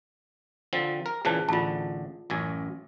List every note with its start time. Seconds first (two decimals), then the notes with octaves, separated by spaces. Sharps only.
0.73 D3 F3 C4
1.06 A#4
1.25 A#2 C#3 E3 G#4 C5 A5
1.49 A1 D3 F4 A5
2.30 A1 F#2 G#5